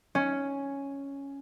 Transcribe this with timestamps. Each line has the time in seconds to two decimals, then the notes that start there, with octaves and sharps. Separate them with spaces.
0.15 C#4